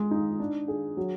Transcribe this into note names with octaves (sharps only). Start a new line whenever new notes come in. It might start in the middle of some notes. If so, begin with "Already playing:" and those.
Already playing: G#3
D#4
D4
G#4
F#3